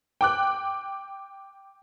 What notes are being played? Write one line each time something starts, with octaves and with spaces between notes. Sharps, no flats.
G5 D6 F#6